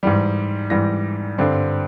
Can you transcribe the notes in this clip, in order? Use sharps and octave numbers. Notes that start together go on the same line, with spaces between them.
G#2 E3 G3
G#2 E3 G3 A#6
G2 D3 G3 C4